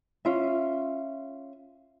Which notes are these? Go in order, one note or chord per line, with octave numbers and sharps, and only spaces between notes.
C#4 F4 E5